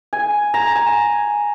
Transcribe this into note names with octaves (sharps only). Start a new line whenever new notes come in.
G#5
A#5
G#5